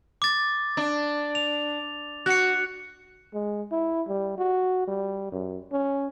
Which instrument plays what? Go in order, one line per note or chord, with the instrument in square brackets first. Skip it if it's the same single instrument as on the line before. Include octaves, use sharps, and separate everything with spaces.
[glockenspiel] D6 A6
[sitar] D4
[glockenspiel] F7
[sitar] F#4 [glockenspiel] F#6 C#7
[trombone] G#3
E4
G3
F#4
G3
F#2
C#4